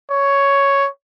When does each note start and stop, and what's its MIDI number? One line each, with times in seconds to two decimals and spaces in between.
0.11 0.88 73